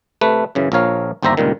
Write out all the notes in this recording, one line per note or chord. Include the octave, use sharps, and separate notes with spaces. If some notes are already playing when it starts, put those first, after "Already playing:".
C3 A3 B4
F#2 C#3 E3
A#1 F3 A#4 C#5 F5
G1 D#2 G4 C5 E5 A#5
C#2 G2 A#2 D#3